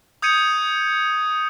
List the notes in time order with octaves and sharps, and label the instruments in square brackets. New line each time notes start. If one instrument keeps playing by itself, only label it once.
[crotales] D#6 G6 G#6 C#7 D#7